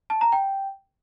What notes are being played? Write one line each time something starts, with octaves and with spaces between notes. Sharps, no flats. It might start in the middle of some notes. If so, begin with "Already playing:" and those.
A5
A#5
G5